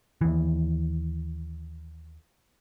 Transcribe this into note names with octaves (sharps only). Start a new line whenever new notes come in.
D#2 E3